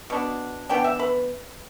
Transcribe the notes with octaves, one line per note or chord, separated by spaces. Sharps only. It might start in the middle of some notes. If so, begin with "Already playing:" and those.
B2 B3 D4
E3 B3 D4 G5
E5
B4